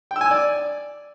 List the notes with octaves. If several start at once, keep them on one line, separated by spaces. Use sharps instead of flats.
G5
E6
G#5
E6
D5